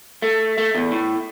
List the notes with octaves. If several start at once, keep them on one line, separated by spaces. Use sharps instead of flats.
A3
A3
E2
A2